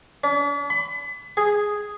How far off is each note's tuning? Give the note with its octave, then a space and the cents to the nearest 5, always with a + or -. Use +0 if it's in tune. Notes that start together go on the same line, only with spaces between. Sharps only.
D4 -45
B5 +30
G#4 -5